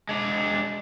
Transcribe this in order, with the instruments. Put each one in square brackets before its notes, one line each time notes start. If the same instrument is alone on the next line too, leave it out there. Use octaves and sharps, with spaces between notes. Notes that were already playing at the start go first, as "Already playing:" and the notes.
[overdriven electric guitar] G#3 D4